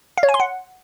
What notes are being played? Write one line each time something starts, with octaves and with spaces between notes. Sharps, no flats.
F5
C#5
G#5
C6
F#5